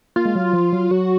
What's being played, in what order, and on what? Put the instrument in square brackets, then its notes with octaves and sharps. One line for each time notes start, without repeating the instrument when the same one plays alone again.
[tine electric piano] A#3 [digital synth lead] F4
[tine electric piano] G#3
F#3
F3
F#3
[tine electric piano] F#3 [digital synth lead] F#4